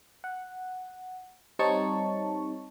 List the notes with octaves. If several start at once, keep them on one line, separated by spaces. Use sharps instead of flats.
F#5
G3 C4 D#4 C#5 A5 C#6